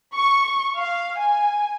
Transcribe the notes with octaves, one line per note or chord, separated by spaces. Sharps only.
C#6
F5
G#5